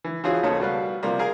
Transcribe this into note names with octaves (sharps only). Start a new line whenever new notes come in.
E3
E3 F3 C#4 F4 F#4 G#4
D#2 C#3 F3 A4 C#5 D#6
B2 G3 B4 F5
C3 F3 G3 A#3
G#4 A#4 F5 G#5